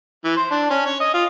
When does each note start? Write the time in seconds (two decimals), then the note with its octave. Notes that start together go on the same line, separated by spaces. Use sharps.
0.25 E3
0.37 C5
0.51 D4
0.71 C#4
0.86 C#5
1.00 D#5
1.14 F4